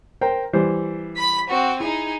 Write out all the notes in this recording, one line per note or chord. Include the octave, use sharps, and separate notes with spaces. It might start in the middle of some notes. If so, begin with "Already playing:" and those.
A#4 C5 G5
E3 G3 C5
B5 B6
C4 F#4
D#4 E4 G#4